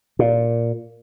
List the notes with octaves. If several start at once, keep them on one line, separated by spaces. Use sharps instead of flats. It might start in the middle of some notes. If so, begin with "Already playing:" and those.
A#2